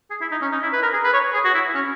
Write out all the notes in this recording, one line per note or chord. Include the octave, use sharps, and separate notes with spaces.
G#4
E4
D#4
C#4
D#4
E4
B4
A#4
G#4
B4
C#5
G#4
F#4
E4
C#4